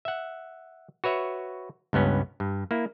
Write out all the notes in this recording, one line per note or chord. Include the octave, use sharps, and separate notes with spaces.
E5 F#5
F#4 B4 C#5 E5
C#2 G2 B3 C#4
G2
A#3 E4